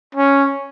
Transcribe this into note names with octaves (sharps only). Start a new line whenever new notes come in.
C#4